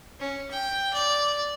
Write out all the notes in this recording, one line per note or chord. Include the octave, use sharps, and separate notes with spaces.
C#4
G5
D5